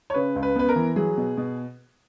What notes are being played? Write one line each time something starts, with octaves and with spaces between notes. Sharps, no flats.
C#5
C#3 B4
C#2
B4
B3 B4
A#4
E3
F#3 G#4
B2
B2